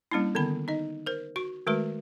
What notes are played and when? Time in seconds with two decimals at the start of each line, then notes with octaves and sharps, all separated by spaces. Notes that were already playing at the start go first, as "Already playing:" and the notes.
0.11 G3 A#3 C#4 D4 E4
0.35 D3 D#3 B3 B5
0.68 D#4 D#5
1.06 A#4 C5
1.36 F#4 C#6
1.67 D#3 G#3 A3 F#4 B4